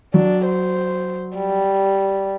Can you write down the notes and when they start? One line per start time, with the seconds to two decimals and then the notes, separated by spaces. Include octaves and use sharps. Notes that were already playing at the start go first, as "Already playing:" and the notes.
0.14 F#3 D4
0.46 C5
1.37 G3